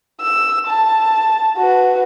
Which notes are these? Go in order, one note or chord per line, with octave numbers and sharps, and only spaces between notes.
E6
A5
F#4 B4